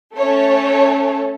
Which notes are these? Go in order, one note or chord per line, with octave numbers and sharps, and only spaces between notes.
A3 C#4 A4 C#5